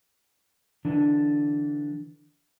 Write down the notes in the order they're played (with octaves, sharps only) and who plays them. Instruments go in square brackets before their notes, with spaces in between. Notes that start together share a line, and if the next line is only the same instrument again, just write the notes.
[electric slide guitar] D3 E3 D4